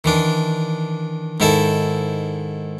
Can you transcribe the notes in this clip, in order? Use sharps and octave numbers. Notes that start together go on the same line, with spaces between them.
D#3 E3 D4
G#2 D#3 E4 A4 A5